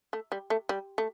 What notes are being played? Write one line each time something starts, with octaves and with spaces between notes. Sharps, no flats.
A3
G3
A3
G3
A3